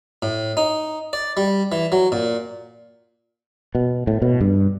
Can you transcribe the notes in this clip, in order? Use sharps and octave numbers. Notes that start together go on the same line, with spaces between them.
A2
D#4
D5
G3
E3
F#3
A#2
B2
A2
B2
G2